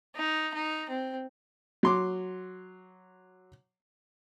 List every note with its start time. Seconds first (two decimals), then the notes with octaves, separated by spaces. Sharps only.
0.15 D#4
0.54 D#4
0.89 C4
1.83 F#3 C6 D6